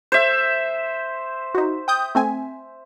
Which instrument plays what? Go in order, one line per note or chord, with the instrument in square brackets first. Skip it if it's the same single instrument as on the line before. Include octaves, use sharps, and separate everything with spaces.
[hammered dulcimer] C5 E5
[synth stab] D#4 F#4
G5 D#6 G6
A3 C4 G#5